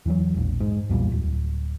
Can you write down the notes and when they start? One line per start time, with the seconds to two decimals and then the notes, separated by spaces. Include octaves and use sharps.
0.06 E2 E3 F#3
0.34 E1 A#1
0.60 G#2
0.89 B1 E2 A#2 G3
1.12 D1